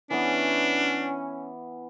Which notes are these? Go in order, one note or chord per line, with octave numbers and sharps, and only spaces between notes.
E3 B3 C#4 D4